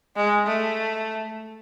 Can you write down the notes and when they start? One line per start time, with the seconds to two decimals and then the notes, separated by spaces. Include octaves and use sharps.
0.16 G#3
0.47 A3